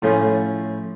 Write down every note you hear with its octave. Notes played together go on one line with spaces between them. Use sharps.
A2 F3 A3 C#4